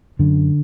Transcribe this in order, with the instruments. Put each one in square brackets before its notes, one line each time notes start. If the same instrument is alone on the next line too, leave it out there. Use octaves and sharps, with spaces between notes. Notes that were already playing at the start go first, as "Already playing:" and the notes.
[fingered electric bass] F#2 D3